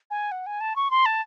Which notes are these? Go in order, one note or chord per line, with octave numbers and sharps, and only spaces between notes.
G#5
F#5
G#5
A5
C#6
C6
A5